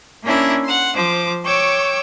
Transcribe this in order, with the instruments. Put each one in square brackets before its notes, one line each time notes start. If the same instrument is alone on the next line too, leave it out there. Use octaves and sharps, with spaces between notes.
[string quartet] A#3 C#4 D4 E4 A#4 E5
F#5 C6
F3 C5 D6
C#5 G5 C#6 D6 E6 G6